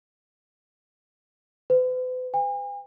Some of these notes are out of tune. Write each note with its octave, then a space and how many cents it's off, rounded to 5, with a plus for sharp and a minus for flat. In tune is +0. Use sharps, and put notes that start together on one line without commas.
B4 +45
G#5 -45